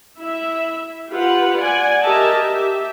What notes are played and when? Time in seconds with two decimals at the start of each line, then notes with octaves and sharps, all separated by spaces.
0.19 E4 E5
1.09 F4 G4 B4 F#5
1.59 D5 F#5 G#5
2.05 G4 A#4 D#5 E5 A5
2.37 G4 E5